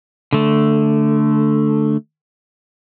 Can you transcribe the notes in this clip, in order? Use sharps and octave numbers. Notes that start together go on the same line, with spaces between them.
D3 A3